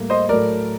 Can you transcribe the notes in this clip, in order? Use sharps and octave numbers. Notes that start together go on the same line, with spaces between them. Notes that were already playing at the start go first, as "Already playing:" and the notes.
Already playing: A2 G3 A#3
C5 D#5
A2 F#3 A3 A#4 D5